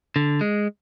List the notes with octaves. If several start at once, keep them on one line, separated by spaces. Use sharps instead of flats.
D3
G#3